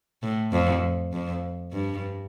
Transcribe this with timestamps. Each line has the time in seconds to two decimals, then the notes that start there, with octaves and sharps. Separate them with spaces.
0.23 A2
0.52 F2
1.13 F2
1.73 G2